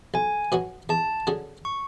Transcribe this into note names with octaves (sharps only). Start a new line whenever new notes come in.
B1 G#5
B2 F#3 B3 F#4
E2 A5
D3 F#3 C#4 G#4
C#6